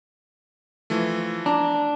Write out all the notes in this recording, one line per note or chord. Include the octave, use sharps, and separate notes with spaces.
E3 F3 A3
D4 A#5